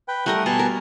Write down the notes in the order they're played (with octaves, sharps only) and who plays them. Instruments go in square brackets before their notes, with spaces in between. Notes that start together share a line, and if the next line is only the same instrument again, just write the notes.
[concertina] B4 G5
[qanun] G3 A#4 D#5 [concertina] A3 F#5
[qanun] B2 [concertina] G#5 A5
[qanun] A#4